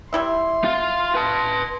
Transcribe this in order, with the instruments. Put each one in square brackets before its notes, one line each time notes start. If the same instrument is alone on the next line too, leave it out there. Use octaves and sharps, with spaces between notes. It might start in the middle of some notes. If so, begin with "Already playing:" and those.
[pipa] G3 E4 E5 [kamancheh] C6
[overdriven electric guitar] F4 F5
B4 A5